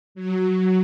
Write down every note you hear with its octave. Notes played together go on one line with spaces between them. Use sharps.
F#3